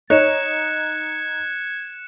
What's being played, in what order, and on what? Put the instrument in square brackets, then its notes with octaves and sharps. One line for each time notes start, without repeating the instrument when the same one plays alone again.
[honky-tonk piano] D#4 [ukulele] C#5 [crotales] F#6 C#7 E7 [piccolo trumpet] G#6